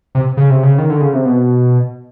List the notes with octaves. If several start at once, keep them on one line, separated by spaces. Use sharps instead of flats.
C3
C#3
C3
C#3
D#3
D3
C#3
C3
B2